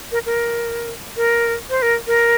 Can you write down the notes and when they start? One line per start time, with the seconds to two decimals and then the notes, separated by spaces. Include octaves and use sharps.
0.12 A#4
0.26 A#4
1.17 A#4
1.70 C5
1.82 A#4
2.07 A#4